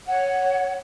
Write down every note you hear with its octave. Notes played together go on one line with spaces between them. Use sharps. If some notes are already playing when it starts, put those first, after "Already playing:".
C#5 F#5